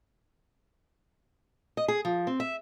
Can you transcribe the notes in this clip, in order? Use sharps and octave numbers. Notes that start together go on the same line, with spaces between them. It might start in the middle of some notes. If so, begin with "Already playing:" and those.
D#5
G#4
F3
C4
E5